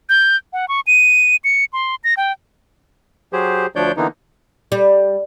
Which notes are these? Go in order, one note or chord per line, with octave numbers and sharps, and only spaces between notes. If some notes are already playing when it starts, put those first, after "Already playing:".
G6
F#5
C#6
D#7
C#7
C6
A#6
G5
F#3 G4 G#4 C5
D2 F3 D4 C#5 D5 G6
D3 E3 A#3 B3 D#4
G3